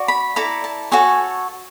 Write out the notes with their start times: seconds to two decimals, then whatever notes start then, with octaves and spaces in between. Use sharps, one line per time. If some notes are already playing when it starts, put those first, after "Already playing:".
Already playing: F#4 D5
0.08 B5
0.36 E4 A4 D5 A#5
0.64 A5
0.92 F#4 A4 C#5 G#5